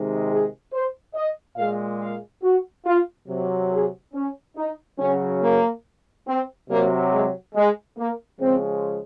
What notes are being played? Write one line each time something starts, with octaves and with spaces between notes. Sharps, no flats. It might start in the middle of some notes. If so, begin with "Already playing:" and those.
Already playing: C3 D#3 G#3
G#4
C5
D#5
A#2 G#3 F5
F5
F#4
F4
C3 F#3
G#4
C#4
D#4
C#3 F#3 C#4
A#3
C4
C3 F#3 A#3
G#3
G#3
A#3
C#3 F3 G#3 C4